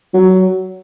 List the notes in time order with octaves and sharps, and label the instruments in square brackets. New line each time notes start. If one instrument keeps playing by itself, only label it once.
[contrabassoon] F#3